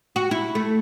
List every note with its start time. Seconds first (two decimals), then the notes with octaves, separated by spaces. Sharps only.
0.16 F#4
0.31 E4
0.55 A3